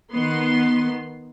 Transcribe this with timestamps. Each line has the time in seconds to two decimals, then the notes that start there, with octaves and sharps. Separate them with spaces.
0.11 D#3 B3 C6